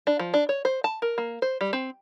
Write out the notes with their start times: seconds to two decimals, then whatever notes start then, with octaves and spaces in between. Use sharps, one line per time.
0.07 D4
0.19 F3
0.34 D4
0.49 C#5
0.65 C5
0.84 A5
1.02 A#4
1.18 A#3
1.42 C5
1.61 G3
1.73 C4